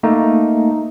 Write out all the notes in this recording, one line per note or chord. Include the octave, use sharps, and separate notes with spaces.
A3 A#3 D#4